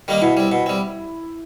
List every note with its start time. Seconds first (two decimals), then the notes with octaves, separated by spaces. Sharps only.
0.08 D#3 G3 A#3 D#4
0.22 B2 E4
0.37 G3 C4
0.52 B2
0.66 G3 C4